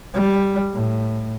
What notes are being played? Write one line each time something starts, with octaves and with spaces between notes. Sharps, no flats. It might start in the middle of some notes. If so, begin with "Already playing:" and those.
G3
A2